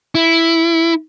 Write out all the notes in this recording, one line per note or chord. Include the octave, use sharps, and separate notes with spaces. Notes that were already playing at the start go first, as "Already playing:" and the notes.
E4